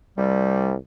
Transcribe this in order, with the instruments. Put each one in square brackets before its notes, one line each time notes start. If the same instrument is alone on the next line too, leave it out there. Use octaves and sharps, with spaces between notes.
[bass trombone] C2 [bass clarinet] G3